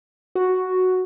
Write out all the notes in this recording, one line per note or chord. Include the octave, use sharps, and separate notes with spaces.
F#4